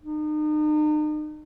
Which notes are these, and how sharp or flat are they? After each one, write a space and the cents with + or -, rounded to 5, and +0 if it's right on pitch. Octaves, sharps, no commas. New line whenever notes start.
D#4 -40